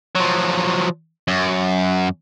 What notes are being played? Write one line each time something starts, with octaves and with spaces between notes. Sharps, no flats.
F3 F#3
F#2